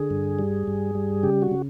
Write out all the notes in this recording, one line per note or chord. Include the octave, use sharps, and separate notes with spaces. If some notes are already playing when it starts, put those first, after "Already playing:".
Already playing: D3 G#4
G2
G3
G2
G3
C#3 G4
F#4
C#3